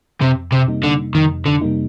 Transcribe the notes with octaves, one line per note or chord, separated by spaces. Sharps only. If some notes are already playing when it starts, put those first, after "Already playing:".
F2 C3
C3
C3 G3 A#3 D#4
D3
F2 D#3
D3
C3 G3 A#3 D#4